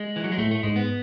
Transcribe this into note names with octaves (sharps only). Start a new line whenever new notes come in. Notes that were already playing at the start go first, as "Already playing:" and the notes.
Already playing: G#3
E3
F#3
G#3
A2 A3
A3
G#2 G#3
B3